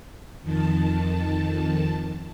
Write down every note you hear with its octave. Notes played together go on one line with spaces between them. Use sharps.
F2 D#3 A5